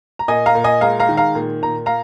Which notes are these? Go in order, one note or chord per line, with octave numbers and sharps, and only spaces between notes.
A#5
A#2 D#5 G#5
F5 A#5
A#2
D#5 G#5
G#3 F5 A#5
F5 A#5
D#3
F5 A#5
A#2
A#2 A#5
F5 A#5